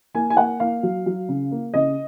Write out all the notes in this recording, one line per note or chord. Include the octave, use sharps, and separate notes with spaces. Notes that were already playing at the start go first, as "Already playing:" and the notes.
A#3 G#5
G#5
A#3 F#5
A#3 F5
F#3
F#3
C#3
A#3
C#3 D#5